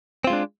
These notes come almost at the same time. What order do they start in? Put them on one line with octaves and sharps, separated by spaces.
C4 F4 G#3 D4